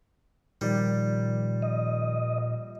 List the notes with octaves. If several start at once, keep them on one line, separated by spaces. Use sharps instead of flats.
A#2 D#3 F3 G3 D5
D#5